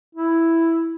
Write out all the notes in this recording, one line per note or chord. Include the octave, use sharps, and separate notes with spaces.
E4